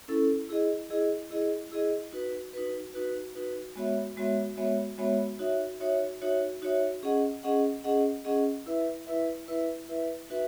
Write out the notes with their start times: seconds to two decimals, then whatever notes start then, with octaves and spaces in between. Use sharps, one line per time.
0.08 C#4 E4 A4
0.49 E4 G#4 D#5
0.90 E4 G#4 D#5
1.31 E4 G#4 D#5
1.72 E4 G#4 D#5
2.13 D#4 F#4 B4
2.53 D#4 F#4 B4
2.94 D#4 F#4 B4
3.35 D#4 F#4 B4
3.76 G#3 B3 F#4 C#5 E5
4.17 G#3 B3 F#4 C#5 E5
4.57 G#3 B3 F#4 C#5 E5
4.98 G#3 B3 F#4 C#5 E5
5.39 D#4 F#4 C#5 E5
5.80 D#4 F#4 C#5 E5
6.21 D#4 F#4 C#5 E5
6.62 D#4 F#4 C#5 E5
7.03 C#4 G#4 D#5 F#5
7.43 C#4 G#4 D#5 F#5
7.84 C#4 G#4 D#5 F#5
8.25 C#4 G#4 D#5 F#5
8.66 E4 B4 E5
9.07 E4 B4 E5
9.48 E4 B4 E5
9.89 E4 B4 E5
10.30 D#4 F#4 B4 E5